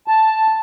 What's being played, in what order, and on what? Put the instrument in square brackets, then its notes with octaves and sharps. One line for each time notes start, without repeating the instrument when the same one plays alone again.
[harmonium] A5